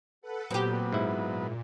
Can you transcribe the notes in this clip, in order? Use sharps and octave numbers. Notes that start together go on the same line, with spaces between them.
A4 B4 F#5
A#2 F#3 B3 C4 G4
G#2 E4